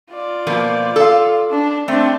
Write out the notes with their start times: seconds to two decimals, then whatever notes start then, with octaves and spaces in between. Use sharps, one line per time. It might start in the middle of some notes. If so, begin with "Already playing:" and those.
0.11 F4 D5
0.47 B2 F3 A#3
0.96 A4 F5
1.50 D4
1.88 A3 C4 D4